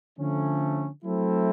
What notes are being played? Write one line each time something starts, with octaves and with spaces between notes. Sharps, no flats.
D3 F3 A3 C#4
F#3 A3 C4 E4 A4